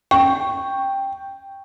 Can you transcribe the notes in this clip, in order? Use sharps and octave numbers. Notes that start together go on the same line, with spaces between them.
G5 C#6